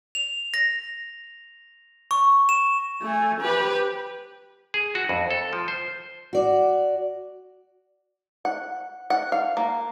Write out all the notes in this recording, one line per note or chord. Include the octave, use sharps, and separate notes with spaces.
F7
A#6
C#6
E7
A3 G#5
G4 B4
G#4
F#4
F2
A4
F3
C5
F#4 D5
F#5
F#5
F5
A#3